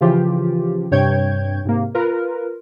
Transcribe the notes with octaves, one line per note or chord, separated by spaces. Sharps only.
C#3 E3 F3 F4 G4
G2 C3 C#5 G5 G6 G#6
G#2 C3 A#3
F4 A#4 B4